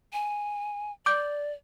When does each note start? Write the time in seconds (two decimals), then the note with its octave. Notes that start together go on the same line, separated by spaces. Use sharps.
0.13 G#5
1.06 D5 D6 G6